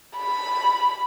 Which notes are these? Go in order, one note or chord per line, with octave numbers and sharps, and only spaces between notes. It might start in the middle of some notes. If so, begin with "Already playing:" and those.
B5